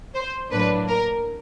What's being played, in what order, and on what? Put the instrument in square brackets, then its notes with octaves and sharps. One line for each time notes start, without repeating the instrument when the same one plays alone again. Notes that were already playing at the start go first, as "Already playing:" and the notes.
[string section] C5
A2 F#3 A#3 D4 B4
A#4